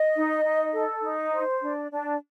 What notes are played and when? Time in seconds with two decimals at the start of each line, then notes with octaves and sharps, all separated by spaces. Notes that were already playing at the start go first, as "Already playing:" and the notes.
Already playing: D#5
0.15 D#4
0.44 D#4
0.73 A4
1.02 D#4
1.32 C5
1.61 D4
1.91 D4